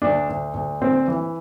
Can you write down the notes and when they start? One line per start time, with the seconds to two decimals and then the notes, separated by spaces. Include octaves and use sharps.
0.02 D2 D4
0.29 D2
0.54 D2
0.81 D2 C4
1.08 E3